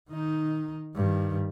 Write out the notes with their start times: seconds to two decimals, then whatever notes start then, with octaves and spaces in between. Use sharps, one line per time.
0.10 D#3 D#4
0.95 G2 D#3